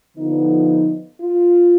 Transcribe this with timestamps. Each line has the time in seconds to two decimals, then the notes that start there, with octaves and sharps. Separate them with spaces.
0.17 D3 F3 B3 D#4
1.21 F4